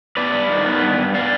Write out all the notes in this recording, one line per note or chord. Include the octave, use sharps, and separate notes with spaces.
B3 B4 D5
G2
D#3
B3
G2
G2
B3 D5 F5